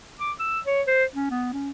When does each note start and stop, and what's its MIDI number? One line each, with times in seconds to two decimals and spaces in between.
0.20 0.32 86
0.40 0.60 88
0.66 0.82 73
0.87 1.04 72
1.16 1.28 61
1.31 1.52 59
1.53 1.71 61